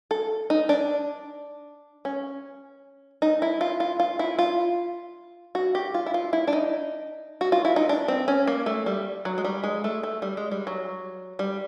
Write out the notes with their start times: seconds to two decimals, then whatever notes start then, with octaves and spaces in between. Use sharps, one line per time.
0.11 A4
0.50 D#4
0.69 D4
2.05 C#4
3.22 D#4
3.42 E4
3.61 F4
3.80 F4
4.00 F4
4.19 E4
4.39 F4
5.55 F#4
5.75 G4
5.94 F4
6.06 E4
6.14 F4
6.33 E4
6.47 D4
6.53 D#4
7.41 F#4
7.52 F4
7.65 E4
7.76 D#4
7.89 D4
8.08 C4
8.28 C#4
8.47 A#3
8.66 A3
8.86 G3
9.25 F#3
9.38 G#3
9.45 G3
9.64 G#3
9.84 A3
10.03 A3
10.22 G3
10.37 G#3
10.51 G3
10.67 F#3
11.39 G3